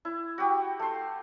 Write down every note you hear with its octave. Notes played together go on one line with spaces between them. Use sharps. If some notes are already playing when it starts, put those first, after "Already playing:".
E4
F#4 G4
A3 C6